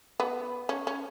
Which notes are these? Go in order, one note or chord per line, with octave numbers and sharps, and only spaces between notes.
B3
C#4
C#4